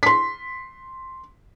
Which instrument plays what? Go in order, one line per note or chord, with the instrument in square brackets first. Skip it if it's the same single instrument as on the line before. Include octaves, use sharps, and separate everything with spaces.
[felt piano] C6 B6